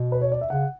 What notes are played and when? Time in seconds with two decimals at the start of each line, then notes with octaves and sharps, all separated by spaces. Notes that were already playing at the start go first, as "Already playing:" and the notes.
Already playing: B2
0.12 B4
0.21 C#5
0.32 D5
0.41 E5
0.50 C#3 F#5